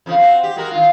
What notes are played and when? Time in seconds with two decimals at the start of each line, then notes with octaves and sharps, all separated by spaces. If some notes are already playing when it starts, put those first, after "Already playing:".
0.06 F2 C#3 F3
0.18 C4 F#4
0.43 G4
0.56 G#3 F#4 A#4
0.71 D#3 F4